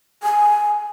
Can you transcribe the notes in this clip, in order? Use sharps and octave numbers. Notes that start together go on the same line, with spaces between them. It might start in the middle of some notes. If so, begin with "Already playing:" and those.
G#5